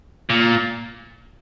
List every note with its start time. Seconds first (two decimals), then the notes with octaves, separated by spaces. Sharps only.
0.30 A#2